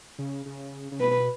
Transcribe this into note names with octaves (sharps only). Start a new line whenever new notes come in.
C#3
C#3
C#3
B2 B4